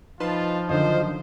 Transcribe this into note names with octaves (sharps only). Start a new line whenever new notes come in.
F3 D#4 F4 B4 A5 C6
F#2 D3 D#3 F4 C5 D#5